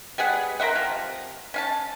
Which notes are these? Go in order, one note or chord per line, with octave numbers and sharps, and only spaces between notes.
G3 B3 G#4 F#5
A#4 C5 E5 F#5
C3 F3
C#4 F5 A5